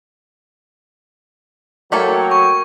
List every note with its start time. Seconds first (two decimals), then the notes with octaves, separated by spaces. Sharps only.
1.92 F#3 A3 A#3 A4 A#4 C#5 G5
2.31 C#6